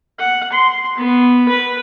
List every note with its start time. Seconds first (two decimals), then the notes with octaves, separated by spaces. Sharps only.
0.19 F#5
0.52 C6
0.97 B3
1.49 B4